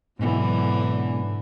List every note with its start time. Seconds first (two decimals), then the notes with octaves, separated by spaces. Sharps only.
0.19 G#2 B2 D3 E3 F#3